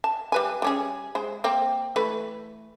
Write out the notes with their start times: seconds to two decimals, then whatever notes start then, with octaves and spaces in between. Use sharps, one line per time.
0.04 A5
0.32 G3 B4 G#5
0.62 G3 C#4 G#4
1.15 G#3 C5
1.44 A#3 C4 G5
1.96 E3 A3 B4